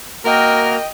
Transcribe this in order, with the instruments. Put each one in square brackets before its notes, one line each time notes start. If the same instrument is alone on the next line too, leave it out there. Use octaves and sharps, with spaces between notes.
[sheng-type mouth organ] A#3 F#4 F6 [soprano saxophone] A#4 [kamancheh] D#5 G5